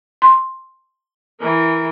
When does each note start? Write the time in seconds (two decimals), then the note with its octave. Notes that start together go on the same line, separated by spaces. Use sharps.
0.22 C6
1.41 E3 A#4